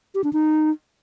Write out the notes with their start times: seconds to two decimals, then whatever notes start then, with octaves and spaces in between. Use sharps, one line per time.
0.15 G4
0.24 D4
0.33 D#4